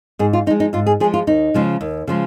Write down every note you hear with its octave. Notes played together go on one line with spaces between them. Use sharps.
G#2 G#4
F4
F3 G#3 D#4
D#4
G#2 F4
G#4
F3 G#3 G#4
F4
D#2 D#4
C#3 F3 G#3
D#2
C#3 F3 G#3